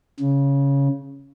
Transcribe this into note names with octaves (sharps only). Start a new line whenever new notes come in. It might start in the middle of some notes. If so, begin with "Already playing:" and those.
C#3